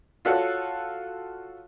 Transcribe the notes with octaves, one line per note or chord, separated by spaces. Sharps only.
F4 F#4 A4 C#5